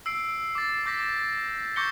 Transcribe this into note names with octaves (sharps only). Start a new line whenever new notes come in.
E6 C7 D7
D6 A6
D6 G6 A#6 B6
C#6 D6 G6 A#6 C#7 G7